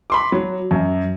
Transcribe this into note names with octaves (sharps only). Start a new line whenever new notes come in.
B5 C6 D6
F#3
F#2